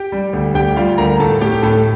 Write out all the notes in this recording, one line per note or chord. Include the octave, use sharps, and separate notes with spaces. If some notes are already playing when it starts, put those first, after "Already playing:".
Already playing: G4 G5
G3
D2
D2 G4 G5
G3 F4 F5
D2 A#4 A#5
A2 A4 A5
A2 G4 G5
A2 A4 A5